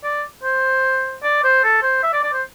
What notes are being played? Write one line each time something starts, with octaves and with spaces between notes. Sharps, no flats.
D5
C5
D5
C5
A4
C5
E5
D5
D5
C5